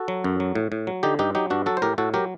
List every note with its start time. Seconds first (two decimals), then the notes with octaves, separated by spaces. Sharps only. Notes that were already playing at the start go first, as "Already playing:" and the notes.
Already playing: F#4 A4
0.08 F#3
0.24 F#2
0.40 F#3
0.55 A2
0.72 A2
0.87 F#3
1.03 D3 D#4 G4
1.19 G2 D#4 G4
1.35 F#3 D#4 G4
1.50 G2 D4 F#4
1.66 F#3 F#4 A4
1.77 C5
1.82 A2 G4 A#4
1.98 A2 F#4 A4
2.14 F#3 G4 A#4